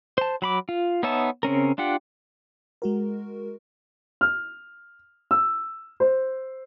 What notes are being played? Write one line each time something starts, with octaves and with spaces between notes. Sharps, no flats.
C5 A5
F#3 B5 D6
F4
B3 D#4 C#5 E5 A5
C#3 C4 C#4 A#4
D4 F4 G4 F#5
G#3 F#4 A#4
F6
E6
C5